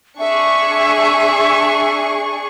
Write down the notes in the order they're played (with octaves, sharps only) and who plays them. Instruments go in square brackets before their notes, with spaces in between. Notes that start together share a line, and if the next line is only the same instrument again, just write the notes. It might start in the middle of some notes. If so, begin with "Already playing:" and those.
[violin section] D4 G#4 C#6 [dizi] E5